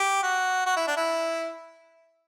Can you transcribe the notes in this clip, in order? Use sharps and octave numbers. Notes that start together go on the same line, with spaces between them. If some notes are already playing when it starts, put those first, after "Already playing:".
Already playing: G4
F#4
F#4
E4
D4
E4